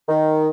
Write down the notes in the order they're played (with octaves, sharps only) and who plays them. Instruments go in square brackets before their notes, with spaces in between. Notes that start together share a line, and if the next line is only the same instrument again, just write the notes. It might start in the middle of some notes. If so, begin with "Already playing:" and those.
[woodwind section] D#3